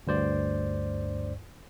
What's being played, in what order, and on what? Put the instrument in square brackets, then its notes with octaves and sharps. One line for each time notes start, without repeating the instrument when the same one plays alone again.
[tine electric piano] D2 G2 C5 D5